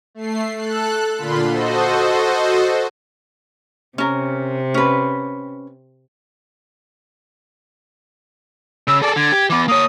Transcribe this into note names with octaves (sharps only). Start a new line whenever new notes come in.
A3 C7
A4 F#6
A#2 D3 F4 B5 C6
F#4 A4 C5 D#5
C3 C#4 A#4
C#4 B4
C#3 E6
G#4 A4 D5
D3 G#6
G4
E3 B3 D6
A#3 C#5 D#6